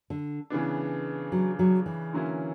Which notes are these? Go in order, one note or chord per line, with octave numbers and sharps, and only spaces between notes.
D3
C#3 E3 B3 D4
F#3
F#3
E3
D3 F#3 A#3 C#4 E4